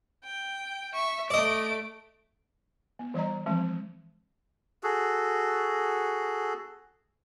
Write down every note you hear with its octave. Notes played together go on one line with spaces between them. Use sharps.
G5
E5 C#6
A3 D5 D#5 D7
B3
E3 G3 D5 D#5 A#5
E3 F3 G#3 C4
F#4 G#4 A4